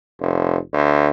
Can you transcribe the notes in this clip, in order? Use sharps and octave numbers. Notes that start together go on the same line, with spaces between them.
F1
D2